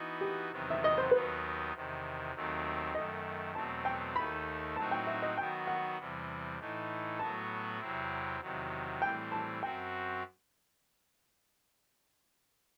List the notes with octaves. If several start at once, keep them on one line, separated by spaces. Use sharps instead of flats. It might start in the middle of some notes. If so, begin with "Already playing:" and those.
Already playing: E3 B3 D#4 F#4
G4
E2 C3 D#3 F#3 B3
E5
D#5
C5
D#2 D#3 F#3 B3 D#4 B4
E2 C3 D#3
D#2 D#3 F#3 A3 C4
F#2 D#3 A3 D#5
E2 B2 F#3 A3 C4 A5
G5
D#2 D#3 A3 D#4 B5
A2 F#3 C4 D#4 F#4 A5
G5
E5
D#5
D#3 F#3 B3 F#4 G5
F#5
E2 C3 E3 G3
A2 E3 A3 D#4
A2 F#3 B3 F#4 A5
E2 C3 F#3 C4 E4
E2 C3 D#3 F#3
A2 E3 G3 C4 G5
A5
F#2 F#3 C4 F#4 G5